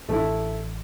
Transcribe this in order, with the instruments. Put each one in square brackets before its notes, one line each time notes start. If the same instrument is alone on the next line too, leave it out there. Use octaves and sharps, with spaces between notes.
[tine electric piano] A1 [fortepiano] A3 E4